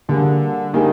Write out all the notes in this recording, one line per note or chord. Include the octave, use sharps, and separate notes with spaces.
D3 G3 A#3 D4 G#4
D#3 G3 A#3 D4 G#4